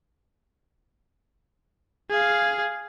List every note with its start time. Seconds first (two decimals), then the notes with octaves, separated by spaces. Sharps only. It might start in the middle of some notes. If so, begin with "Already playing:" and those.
2.10 G#4 F5